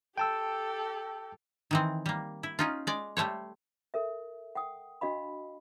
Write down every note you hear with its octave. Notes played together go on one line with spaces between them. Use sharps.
G4 A4 G5 A5 E6
D#3 E3 C4
G3 A#3
E4
C#4 D#4 F4
G#3 D5
G3 A3 C5 C#5
A4 A#4 E5
F#5 G5 D#6
D4 F#4 D#5 F5 B5